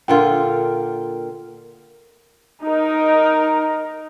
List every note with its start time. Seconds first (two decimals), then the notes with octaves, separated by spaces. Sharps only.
0.08 A#2 D3 F4 A#4 G5
2.64 D#4 A#4